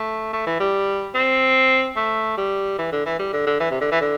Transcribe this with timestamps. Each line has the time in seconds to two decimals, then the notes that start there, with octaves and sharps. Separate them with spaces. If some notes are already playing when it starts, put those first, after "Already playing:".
Already playing: A3
0.33 A3
0.47 E3
0.60 G3
1.15 C4
1.96 A3
2.38 G3
2.78 E3
2.92 D3
3.06 E3
3.19 G3
3.33 D3
3.47 D3
3.60 E3
3.71 C3
3.81 D3
3.91 E3
4.01 D3